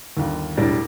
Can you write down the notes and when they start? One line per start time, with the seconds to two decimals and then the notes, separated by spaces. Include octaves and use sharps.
0.17 G1 D#2
0.57 E1 A2 G3 D4 D5 A#6